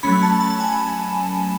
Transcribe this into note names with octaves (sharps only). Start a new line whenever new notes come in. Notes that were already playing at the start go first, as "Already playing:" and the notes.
F#3 A3 C#4 B5
A5
A5
G#5